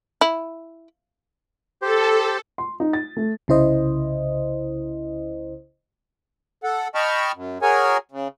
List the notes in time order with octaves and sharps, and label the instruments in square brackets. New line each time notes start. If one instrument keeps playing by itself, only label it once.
[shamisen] E4
[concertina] G4 C5 [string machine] A4
[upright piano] C6
D#4
A6
A3
[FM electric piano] C2 C#3 E4 C5 D#5
[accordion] A4 F#5
D#5 G5 A5 B5 C#6 F6
F#2
F#4 G#4 A#4 C#5 G#5
C#3